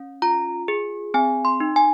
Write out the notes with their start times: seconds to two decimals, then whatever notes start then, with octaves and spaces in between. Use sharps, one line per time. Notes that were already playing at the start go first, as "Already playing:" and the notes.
Already playing: C#4
0.22 F4 A#5
0.68 G#4
1.14 C4 G#5
1.45 C6
1.60 D#4
1.76 G#5